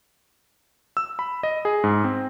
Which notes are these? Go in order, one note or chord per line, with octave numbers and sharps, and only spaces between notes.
E6
B5
D#5
G#4
G#2
C4